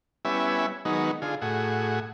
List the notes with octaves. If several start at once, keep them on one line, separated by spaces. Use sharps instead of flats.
G3 B3 C#4 E4 E5 G#5
D#3 F#3 G#3 B3 D#4
D3 F4 G#4
A2 F#4 G#4